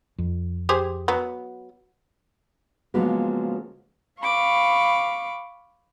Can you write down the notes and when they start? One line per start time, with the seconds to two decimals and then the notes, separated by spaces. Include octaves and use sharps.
0.19 F2
0.69 G4 G#4 C5
1.08 F#3 B3
2.94 C#3 F3 F#3 G#3 A#3 B3
4.21 F5 B5 C#6 D6